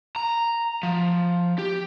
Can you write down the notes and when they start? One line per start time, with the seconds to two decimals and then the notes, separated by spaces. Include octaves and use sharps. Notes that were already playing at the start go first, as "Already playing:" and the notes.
0.16 A#5
0.83 F3
1.59 G4